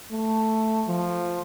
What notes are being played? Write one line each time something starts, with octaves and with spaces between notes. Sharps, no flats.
A3
F3